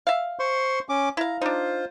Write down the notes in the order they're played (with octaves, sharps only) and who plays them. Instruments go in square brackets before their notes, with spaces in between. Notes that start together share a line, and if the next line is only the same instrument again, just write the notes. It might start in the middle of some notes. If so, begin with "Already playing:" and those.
[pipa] E5 F5
[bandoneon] C5 C6 C#6
C#4 D6
[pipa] E4 F5 [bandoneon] A#5
[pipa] D4 D#4 [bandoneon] F4 C5